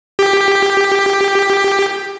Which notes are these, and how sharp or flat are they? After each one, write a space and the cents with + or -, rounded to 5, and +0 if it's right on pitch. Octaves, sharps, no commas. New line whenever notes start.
G4 +10